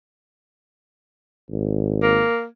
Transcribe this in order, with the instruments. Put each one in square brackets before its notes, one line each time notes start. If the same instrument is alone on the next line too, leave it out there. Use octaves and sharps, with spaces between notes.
[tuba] G#1
[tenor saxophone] A#3